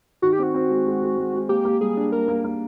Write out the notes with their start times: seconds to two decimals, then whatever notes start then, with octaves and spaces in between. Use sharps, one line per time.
0.22 D#3 F#4
0.33 G4
0.39 C4 F#4
0.54 C4
0.70 G#3
0.86 G#3
1.02 G#3
1.17 G#3
1.34 G#3
1.49 A#3 G4
1.65 A#3
1.81 G3 G#4
1.97 D4
2.12 A#3 A#4
2.28 A#3
2.44 A#3